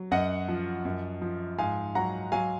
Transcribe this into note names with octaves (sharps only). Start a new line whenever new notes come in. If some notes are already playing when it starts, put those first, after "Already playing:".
Already playing: F#3
F#2 D#5 F#5
F3
F#2
F3
G#2 F5 G#5
F#3 F#5 A#5
F#3 F5 G#5